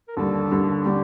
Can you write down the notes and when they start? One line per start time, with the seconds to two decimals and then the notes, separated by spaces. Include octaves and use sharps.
0.08 A#4
0.17 D#2 D3 G3 A4
0.51 D#2 D3 G3
0.85 D3 G3 G4